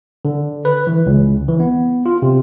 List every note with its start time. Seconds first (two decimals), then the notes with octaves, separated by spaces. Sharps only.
0.25 D3
0.65 B4
0.87 E3
1.06 C#2
1.48 E3
1.60 B3
2.06 F4
2.22 C3